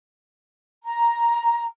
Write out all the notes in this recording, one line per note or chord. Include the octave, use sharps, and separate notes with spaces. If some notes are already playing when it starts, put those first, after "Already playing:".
A#5